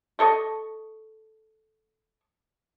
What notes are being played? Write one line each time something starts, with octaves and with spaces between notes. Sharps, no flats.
A3 A4 D#5 C#6